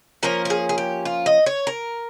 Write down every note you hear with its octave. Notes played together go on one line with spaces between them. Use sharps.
F3 A#3 C#4 A#4
A#4
G#4
G#4
G4
F4
D#5
C#5
A#4